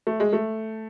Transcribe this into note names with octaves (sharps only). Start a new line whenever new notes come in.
A3
G#3
A3